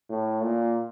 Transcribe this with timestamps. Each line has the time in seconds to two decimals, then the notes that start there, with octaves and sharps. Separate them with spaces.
0.10 A2
0.43 A#2